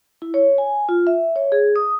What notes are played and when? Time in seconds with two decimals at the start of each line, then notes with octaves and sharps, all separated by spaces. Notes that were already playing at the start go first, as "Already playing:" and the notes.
0.22 E4
0.34 C#5
0.58 G#5
0.89 F4
1.07 E5
1.36 C#5
1.52 G#4
1.76 D#6